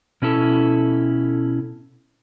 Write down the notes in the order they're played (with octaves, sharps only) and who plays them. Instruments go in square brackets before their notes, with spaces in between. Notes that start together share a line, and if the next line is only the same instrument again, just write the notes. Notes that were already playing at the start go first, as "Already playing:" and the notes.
[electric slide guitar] B2 C#4 E4 A4